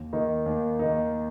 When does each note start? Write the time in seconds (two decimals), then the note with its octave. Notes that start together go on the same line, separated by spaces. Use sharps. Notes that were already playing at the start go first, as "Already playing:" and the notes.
Already playing: D#2
0.13 D#3 A#3 D#4
0.46 D#2
0.79 D#3 A#3 D#4